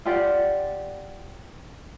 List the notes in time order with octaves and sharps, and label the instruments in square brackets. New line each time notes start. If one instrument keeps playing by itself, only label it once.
[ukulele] F4 G4 D5 F#5